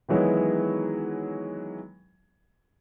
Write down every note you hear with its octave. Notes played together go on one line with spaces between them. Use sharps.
D#3 E3 F#3 G#3 B3 E4